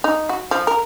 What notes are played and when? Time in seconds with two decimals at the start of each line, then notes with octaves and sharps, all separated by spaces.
0.04 D#4
0.29 F#4
0.51 F3
0.67 A#4